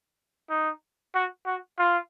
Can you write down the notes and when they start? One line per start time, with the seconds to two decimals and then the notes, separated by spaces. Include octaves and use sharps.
0.50 D#4
1.15 F#4
1.46 F#4
1.78 F4